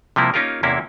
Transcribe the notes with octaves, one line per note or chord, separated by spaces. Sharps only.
C3 F3 G3 A#3 E4
A#3 C#4 D#4 F4 G4 A#4
E2 C3 A#3 C#4 E4